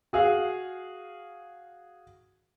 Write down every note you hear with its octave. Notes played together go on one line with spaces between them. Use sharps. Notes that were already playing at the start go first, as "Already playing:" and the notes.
F#4 G#4 F5